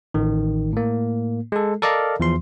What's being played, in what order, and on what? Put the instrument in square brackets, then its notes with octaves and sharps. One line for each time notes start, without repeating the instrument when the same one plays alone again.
[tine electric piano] A1 D#3
A2 A#3
G#3 A4
A4 A#4 D5 D#5 F5 A#5
E2 F3 C6